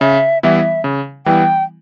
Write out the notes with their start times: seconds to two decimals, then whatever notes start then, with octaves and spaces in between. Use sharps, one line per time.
0.01 C#3 E5
0.43 E3 G3 B3 E4 E5
0.84 C#3
1.26 E3 G3 B3 E4 G5